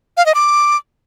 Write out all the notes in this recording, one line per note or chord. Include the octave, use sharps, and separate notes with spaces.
F5
D#5
D6